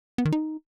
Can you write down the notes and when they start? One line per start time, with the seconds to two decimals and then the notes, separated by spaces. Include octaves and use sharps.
0.18 B3
0.25 D#3
0.33 D#4